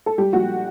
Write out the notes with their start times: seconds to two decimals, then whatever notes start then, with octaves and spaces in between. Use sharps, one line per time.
0.06 A4
0.18 G3 G4
0.33 A#1 F#4